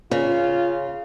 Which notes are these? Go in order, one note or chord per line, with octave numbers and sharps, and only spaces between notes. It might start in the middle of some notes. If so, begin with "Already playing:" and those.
C#3 F4